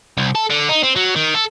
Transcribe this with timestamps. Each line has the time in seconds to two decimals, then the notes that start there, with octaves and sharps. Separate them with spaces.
0.17 C2
0.35 A4
0.50 D3
0.69 D#4
0.83 C4
0.96 F#3
1.16 D#3
1.34 A4